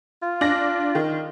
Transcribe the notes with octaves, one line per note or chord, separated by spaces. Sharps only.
F4
D4 A#6
D#3